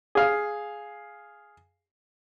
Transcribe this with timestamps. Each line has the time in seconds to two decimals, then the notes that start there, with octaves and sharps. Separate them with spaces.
0.15 G#4 F5